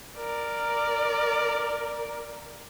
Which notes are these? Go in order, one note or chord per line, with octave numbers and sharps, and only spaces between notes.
A#4 D5